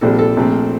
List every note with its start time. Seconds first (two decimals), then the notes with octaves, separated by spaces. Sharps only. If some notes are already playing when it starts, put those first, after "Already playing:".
0.01 A#1 A#2 G3 C4 A4
0.18 A4
0.37 A#1 A#2 A3 C4